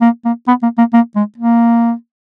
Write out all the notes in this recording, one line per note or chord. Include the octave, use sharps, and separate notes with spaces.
A#3
A#3
B3
A#3
A#3
A#3
G#3
A#3